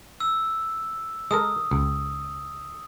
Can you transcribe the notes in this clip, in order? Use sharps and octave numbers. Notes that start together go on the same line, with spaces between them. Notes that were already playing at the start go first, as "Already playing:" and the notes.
E6
G#3 A4 A#4 D#6
C#2